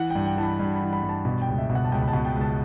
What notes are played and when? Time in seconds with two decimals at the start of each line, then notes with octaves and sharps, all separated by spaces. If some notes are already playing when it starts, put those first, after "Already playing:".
Already playing: E3 F#5
0.10 G2 G5
0.26 G5
0.37 E3 A5
0.43 B5
0.59 G2 B5
0.76 B5
0.82 E3
0.93 B5
1.03 G2
1.09 A5
1.25 B2 B5
1.42 G5
1.48 C#2
1.58 E5
1.70 B2
1.75 F#5
1.85 A5
1.92 C#2 G5
2.01 B5
2.08 A5
2.13 B2
2.25 G5
2.35 C#2
2.41 A5